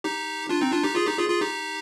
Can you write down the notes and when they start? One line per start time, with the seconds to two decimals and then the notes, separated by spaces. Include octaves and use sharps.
0.04 D#4 G4
0.49 D4 F4
0.61 C4 D#4
0.72 D4 F4
0.84 D#4 G4
0.95 F4 G#4
1.07 D#4 G4
1.18 F4 G#4
1.29 F4 G#4
1.41 D#4 G4